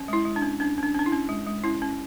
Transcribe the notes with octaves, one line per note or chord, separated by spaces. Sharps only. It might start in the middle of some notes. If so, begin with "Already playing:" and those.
Already playing: C#4
G#3 E4
G#3
D4
C#4
C#4 D4
C#4
D4
C#4 D4
E4
C#4
G#3
G#3
C#4 E4
C#4